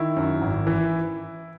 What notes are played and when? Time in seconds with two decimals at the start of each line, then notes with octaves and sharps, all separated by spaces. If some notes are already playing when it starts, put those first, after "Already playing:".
Already playing: D#3 E4
0.16 F#2
0.42 G#1
0.67 E3